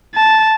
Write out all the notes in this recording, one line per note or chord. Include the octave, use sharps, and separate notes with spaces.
A5